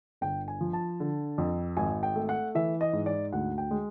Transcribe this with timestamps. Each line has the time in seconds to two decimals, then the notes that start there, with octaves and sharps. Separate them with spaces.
0.21 G1 G5
0.48 G#5
0.61 F3
0.73 A5
1.00 D3
1.38 F2
1.77 G#1 G#5
2.03 G5
2.16 A3
2.29 F#5
2.55 E3 E5
2.81 D#5
2.93 G#2
3.06 D5
3.33 D2 F#5
3.58 G5
3.71 G#3